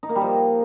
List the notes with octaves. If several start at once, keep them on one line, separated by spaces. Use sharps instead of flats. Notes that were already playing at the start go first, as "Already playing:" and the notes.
D#4
A#3
G3
F3